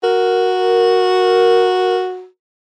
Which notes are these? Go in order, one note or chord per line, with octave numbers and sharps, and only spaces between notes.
F#4 A#4